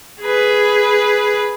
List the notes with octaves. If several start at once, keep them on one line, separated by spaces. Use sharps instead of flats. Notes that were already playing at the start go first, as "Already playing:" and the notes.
G#4 B4